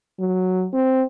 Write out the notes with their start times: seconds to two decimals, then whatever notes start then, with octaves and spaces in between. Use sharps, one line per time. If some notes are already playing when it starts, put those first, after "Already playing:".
0.20 F#3
0.73 C4